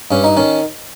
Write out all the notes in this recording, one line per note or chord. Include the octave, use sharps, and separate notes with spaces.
G2 C#4
D#4
D#3 C#4